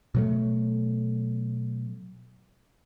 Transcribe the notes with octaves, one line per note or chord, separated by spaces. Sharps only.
B2 F#3 A3